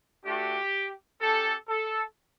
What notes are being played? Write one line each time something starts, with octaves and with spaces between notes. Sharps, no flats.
A3 D4 F#4 G4
C#4 G4 A4
A4